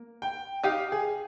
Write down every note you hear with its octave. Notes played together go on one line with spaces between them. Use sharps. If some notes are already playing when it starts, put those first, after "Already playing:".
Already playing: A#3
G5
D#4 G4 F5
G#4